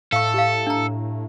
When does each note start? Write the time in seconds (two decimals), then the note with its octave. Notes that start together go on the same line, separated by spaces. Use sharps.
0.12 A2 A4 F5 C#6
0.34 G4 F5
0.67 D4 A#5